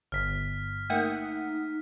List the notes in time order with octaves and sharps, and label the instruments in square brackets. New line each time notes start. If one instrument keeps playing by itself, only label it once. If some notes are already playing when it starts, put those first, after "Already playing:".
[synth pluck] G1 [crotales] F6 B6
[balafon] A3 A#3 A#4 [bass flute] D#4 [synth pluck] E5 F#5 D#6